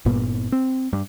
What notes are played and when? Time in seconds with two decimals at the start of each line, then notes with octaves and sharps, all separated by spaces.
0.05 G1 G2 A#2 B3
0.52 C4
0.93 G2